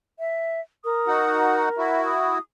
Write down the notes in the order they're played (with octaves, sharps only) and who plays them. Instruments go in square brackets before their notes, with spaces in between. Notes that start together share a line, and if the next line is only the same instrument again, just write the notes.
[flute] E5
[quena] A#4 [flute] D#6
[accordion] D#4 F#4 F#5
[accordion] E4 F#4 [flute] E5
[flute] D#6